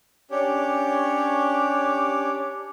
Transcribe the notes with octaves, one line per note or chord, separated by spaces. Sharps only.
C#4 D4 G4 C#5